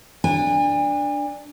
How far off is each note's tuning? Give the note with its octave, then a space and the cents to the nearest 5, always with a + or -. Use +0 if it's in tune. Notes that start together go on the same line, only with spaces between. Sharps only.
D4 +0 G#5 -40